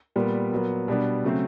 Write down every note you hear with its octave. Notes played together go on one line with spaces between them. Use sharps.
A#2 G3 B3
A#2 F#3 B3
B2 G3 B3 D4
C#3 F#3 A3 C4